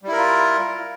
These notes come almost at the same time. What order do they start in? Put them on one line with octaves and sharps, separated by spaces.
G3 E4 A#4 F4